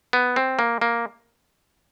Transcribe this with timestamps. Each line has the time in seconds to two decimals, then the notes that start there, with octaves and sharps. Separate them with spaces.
0.13 B3
0.36 C4
0.59 A#3
0.81 A#3